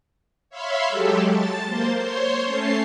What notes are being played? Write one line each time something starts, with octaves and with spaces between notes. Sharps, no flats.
C#5 E5 F5 B5 C6
F#3 G#3 G4 A4
A5 A6
A#3 C5 C6
C5 C#5 C6
A3 C#4 A5 C7